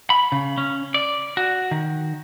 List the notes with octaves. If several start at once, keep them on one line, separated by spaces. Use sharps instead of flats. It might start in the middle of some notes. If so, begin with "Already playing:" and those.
B5
C#3
C#4
D5
F#4
D#3